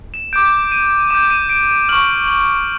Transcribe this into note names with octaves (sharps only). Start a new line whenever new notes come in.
E7
D6 G6 D7
D#7
D6 G6 E7
D#7
D7
D7
C#6 F6 F#7
F#7